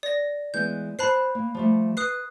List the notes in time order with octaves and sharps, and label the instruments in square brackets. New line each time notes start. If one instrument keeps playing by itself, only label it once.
[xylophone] D5 A#6
[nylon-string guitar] E3 G#3 B3 [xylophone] G6
[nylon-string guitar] C5 A5 [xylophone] B5 F#6 C7
[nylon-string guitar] A#3
F3 G3 A3
[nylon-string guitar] B4 [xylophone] D#6 F#6 C7